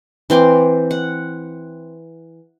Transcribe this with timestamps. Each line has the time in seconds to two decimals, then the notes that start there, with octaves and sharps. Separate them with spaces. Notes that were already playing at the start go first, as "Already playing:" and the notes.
0.30 E3 C4 C6 D6
0.91 F#5